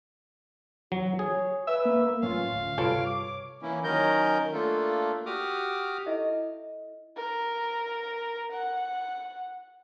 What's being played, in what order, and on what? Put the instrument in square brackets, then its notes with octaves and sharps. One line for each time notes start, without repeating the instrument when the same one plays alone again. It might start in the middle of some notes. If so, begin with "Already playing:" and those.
[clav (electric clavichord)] F#3 [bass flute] F#4
[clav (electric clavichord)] G#4 [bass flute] C#5
[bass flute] B4 [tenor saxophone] E5
[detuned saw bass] A#3
[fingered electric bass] A2 F#3 A3 [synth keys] C#4 F4 [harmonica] F5
[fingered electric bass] D2 A2
[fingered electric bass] G2 C3 G3 [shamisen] F4 A4 B4 [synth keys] C#5 D7
[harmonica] D6
[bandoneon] E3 A#3 C#4 E4
D#3 F#3 C#4 A#4 D#5 G6
A3 A#3 D4 F4 A4
F#4 G4 D6 D#6 F6
[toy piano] E4 A4 D#5 E5
[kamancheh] A#4
F#5